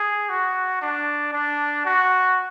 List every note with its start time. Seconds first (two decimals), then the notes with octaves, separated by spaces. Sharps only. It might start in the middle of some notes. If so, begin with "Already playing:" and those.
Already playing: G#4
0.30 F#4
0.82 D4
1.33 D4
1.85 F#4